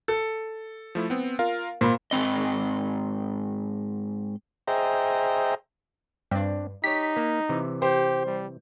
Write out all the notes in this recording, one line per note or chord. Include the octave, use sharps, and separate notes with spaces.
A4
F3 A3 E4
B3 C4
F4 A#4 F5
A#2 C5 A#5 B5
G#2 C4 D#5
G#4 C5 D#5 E5 G5 A#5
G2 C4 D4
D#4 G4 C#5 B6
A#3
C3 E3
G4 C5
G3